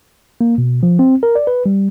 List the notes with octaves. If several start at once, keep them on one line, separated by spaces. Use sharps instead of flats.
A#3
B2
F3
C4
A#4
D5
B4
G3